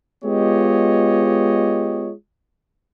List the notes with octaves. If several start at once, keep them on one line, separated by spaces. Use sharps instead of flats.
G#3 B3 F4 G4 C#5 D#5